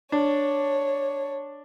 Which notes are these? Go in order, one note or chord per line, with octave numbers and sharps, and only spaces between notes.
D4 C#5